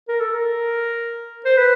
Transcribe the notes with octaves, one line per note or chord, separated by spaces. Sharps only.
A#4
A4
A#4
C5
B4